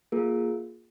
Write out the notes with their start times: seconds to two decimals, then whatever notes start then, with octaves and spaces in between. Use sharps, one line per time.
0.12 A#3 F4 G#4 A#4